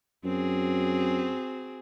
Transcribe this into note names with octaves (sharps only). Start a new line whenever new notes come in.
F#2 C4 F#4 G#4